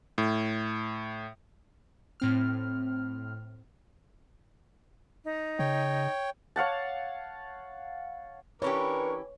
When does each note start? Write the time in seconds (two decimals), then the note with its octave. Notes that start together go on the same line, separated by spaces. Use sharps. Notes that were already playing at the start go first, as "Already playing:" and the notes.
0.18 A2
2.20 A2 C4 F6
5.25 D#4
5.59 C#3 C#5 G5
6.56 C#5 F5 F#5 A5
8.62 E3 C#4 D4 G4 A#4 B4 C#5 C#6